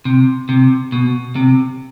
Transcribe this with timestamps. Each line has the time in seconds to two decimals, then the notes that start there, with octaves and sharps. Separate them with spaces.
0.05 C3
0.49 C3
0.92 B2
1.36 C3